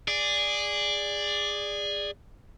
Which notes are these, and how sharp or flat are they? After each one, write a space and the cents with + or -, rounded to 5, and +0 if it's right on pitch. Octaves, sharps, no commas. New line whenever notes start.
G#4 -15 D5 +5